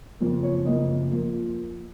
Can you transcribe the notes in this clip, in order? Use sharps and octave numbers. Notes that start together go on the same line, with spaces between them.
F#1 F2 F3 A#3
C#5
F#1 F2 F3 A#3 D#5
F3 A#3